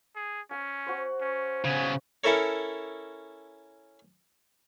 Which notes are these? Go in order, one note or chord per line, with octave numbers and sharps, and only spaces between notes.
G#4
C#4 G#5
F#4 C5
C#4
C#3 B3 G#5
C#4 E4 A4 A#4 C#5